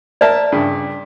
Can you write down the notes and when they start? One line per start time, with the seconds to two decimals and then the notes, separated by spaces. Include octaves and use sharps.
0.21 A#4 D5 E5 A5
0.52 G2 C#3